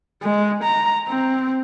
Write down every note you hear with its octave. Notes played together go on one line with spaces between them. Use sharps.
G#3
A#5
C4